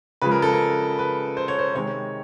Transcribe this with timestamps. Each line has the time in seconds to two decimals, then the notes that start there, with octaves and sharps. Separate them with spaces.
0.22 C#3 F3 G#3 B4
0.31 A#4
0.42 A4
0.53 A#4
0.99 B4
1.37 C5
1.48 C#5
1.59 C5
1.75 C3 D#3 G#3 C#5